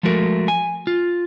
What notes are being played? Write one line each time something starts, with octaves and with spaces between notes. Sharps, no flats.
F3 G#3 A3 F#4 A#4
G#5
F4